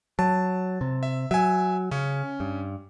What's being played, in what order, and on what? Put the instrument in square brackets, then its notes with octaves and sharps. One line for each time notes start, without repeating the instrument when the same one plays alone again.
[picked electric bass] F#3 [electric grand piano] A5
[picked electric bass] C3
[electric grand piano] E5
[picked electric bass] F#3 [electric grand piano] E5 G#5
[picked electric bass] C#3 [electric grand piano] C#4
[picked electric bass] G2